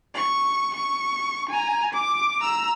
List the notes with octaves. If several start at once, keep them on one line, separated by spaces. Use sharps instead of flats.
C#6
C#6
G#5 A#5
D6
A#5 E6